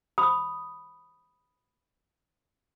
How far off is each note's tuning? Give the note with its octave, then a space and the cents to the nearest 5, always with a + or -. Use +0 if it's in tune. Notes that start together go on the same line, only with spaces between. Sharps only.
B5 +0 D#6 +0